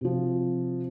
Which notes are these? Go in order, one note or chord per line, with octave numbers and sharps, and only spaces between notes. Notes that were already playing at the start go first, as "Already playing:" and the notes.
C3 F3